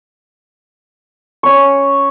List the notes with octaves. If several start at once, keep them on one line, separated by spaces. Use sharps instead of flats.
C#4 C#6